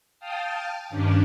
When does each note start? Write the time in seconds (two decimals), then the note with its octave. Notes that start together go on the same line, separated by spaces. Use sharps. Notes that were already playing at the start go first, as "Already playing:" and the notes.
0.19 F5 G5 A5 D#6 F6
0.89 G2 D#3 C#4 D4 D6